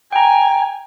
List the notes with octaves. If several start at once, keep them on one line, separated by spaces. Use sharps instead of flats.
G5 G#5 A#5